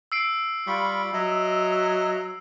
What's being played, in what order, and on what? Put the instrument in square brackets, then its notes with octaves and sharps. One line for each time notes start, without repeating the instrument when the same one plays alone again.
[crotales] E6 C7 D7
[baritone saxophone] G3 [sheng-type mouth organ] F4 B5 C#6
[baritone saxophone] F#3 [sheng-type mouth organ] D#5 E5